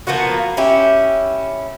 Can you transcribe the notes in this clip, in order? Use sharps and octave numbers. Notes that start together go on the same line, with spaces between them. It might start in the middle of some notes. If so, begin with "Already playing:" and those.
F3 A#3 B3 F#4
C#4 E4 G4